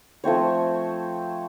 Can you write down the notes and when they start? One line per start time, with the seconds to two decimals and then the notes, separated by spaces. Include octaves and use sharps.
0.24 F3 A3 C4 C#5